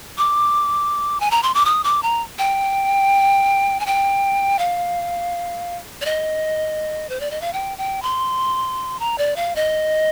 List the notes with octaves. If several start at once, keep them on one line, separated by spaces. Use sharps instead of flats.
D6
G#5
A#5
C6
D6
D#6
D6
A#5
G5
G#5
G5
F5
D5
D#5
C5
D5
D#5
F5
G5
G5
C6
A#5
D5
F5
D#5